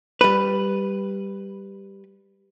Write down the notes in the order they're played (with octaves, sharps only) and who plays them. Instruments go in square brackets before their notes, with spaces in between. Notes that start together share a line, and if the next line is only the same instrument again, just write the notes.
[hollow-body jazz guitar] G3 B4